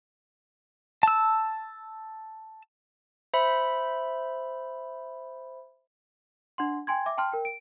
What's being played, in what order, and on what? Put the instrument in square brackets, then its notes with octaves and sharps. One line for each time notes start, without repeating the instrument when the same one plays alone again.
[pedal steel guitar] A5 E6
[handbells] C5 E5 B5
[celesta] D4 F#5 C6
G5 G#5 C6 G#6
E5 D6
G5 A5 C6 F6
A#4 G5
D7